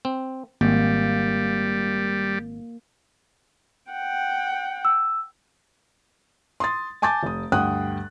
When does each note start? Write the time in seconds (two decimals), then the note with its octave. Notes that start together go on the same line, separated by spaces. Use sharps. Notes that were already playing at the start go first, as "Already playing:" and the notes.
0.05 C4
0.61 G#1 G3 A#3
3.91 F#5 G5
4.85 E6
6.60 C6 D#6 A6
7.02 G#5 A5 D6 G6 A6
7.23 F1 D#6
7.52 D2 G2 F#5 G5 D#6 F#6